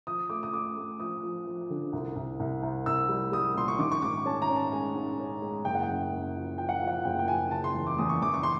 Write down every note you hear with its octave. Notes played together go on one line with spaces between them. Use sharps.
F3 D#6
A3 D6
D#6
A3 D6
A3
F3 D#6
F3
F3
D3
C2
C2
C2
C2
C2 E6
G3
G3 D#6
A#2 C6
C#6
D#3 D6
C#6
G#2 D6
C#4 A5
A#5
C#4
A5
G#3 G#5
G#2
C#4
G#3
F#1 G5
F#5
G5
F#2
F#2
F3
F3 G5
F#5
F3 F5
F#5
F#1 G5
G5
F3 G#5
C#3 A5
C6
E2
D6
E2 D#6
C#6
E2 D6
C#6
C6